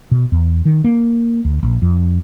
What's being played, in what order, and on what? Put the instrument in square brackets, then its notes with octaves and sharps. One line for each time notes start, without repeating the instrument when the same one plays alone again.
[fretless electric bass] B2
E2
D#3
A#3
D2
A#1
F2